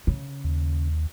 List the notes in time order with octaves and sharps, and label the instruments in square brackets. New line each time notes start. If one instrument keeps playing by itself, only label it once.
[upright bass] C#3
[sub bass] D#2